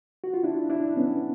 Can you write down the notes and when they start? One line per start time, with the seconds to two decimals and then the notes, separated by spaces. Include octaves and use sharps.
0.24 F#4
0.34 F4
0.43 D4 E4
0.70 D4 E4
0.96 B3 C#4